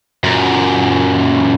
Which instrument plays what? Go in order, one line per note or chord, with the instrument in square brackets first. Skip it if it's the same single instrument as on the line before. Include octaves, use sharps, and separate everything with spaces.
[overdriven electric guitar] F#2 A#2